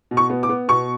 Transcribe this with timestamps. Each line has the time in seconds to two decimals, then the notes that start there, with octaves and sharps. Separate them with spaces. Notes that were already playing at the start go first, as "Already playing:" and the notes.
0.11 B2
0.17 C#6
0.30 B3
0.43 D6
0.49 B3
0.68 B2 C#6